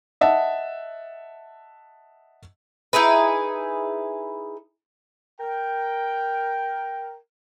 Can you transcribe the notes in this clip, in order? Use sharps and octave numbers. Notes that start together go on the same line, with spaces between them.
D#5 E5 F#5 A5
D#4 E4 G#4 B4
A#4 G5